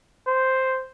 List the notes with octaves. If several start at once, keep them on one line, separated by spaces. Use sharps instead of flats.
C5